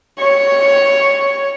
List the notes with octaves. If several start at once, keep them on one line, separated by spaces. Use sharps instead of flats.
C#5